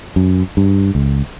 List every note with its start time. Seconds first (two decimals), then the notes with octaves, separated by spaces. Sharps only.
0.16 F#2
0.57 G2
0.95 C#2